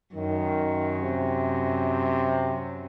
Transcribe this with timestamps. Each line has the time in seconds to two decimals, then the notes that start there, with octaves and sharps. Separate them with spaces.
0.15 F#2 D#3
1.01 C3